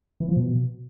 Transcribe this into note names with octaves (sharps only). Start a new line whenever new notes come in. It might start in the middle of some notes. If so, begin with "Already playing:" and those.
E3
F3
B2